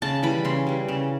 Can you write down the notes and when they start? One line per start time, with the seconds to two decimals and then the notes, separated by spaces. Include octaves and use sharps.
0.02 C#3 A5
0.23 E3 G3 B5
0.45 C#3 C6
0.67 E3 G3
0.88 C#3